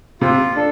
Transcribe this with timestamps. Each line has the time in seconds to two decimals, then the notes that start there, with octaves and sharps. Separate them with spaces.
0.21 C3 F4
0.56 D4 A4